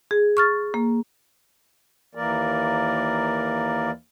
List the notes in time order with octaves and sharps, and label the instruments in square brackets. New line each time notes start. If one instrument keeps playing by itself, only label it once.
[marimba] G#4
C#6 F6 A6
A#3
[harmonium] D#2 E3 A#3 A#4 D5